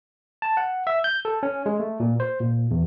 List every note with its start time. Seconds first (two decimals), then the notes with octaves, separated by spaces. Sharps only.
0.42 A5
0.57 F#5
0.87 E5
1.04 G6
1.25 A4
1.43 C#4
1.66 G#3
1.80 A3
2.00 A#2
2.20 C5
2.40 A#2
2.71 E2